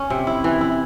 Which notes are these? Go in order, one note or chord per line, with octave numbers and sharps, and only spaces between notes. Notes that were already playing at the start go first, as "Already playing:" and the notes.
Already playing: C#4
C3
E4
E3
E4